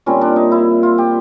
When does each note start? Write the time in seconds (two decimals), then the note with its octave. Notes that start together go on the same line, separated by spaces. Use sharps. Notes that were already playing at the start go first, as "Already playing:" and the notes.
0.06 A#2 G3 C4 C#4
0.21 D4
0.36 D#4
0.52 E4
0.83 F4
0.98 G4